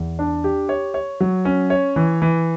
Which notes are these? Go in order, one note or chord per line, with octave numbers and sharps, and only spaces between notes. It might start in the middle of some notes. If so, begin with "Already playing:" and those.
Already playing: E2
D4
G4
C#5
C#5
F#3
C#4
C#5
E3
E3